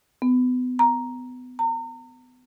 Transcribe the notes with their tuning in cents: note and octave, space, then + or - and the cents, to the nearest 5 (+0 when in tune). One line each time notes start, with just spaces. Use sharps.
B3 +30
A#5 +5
A#5 -35